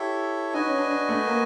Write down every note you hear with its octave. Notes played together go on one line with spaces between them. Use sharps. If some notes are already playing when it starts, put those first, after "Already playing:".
Already playing: E4 G4 A4 C#5 E5
D#4 F#4 B4 D#5 G#5
C#4
D4
D4
A3
A#3